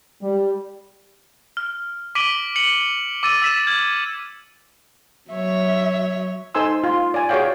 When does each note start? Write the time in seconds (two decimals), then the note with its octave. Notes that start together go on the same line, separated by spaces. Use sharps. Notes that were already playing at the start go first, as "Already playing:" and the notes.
0.21 G3
1.57 F6
2.15 D6 B6 D7 D#7 F#7 G7
2.56 C#7 F#7
3.23 D6 E6 A6 D#7
3.42 E6 A6 B6 D#7 E7
3.67 F6 G#6
5.31 F#3 C#5 E5
6.55 D#4 A4 C5 G#5 C6 E6
6.84 F4 C6
7.14 D5 G#5
7.29 F#4 G#4 C#5 D5 F5 G5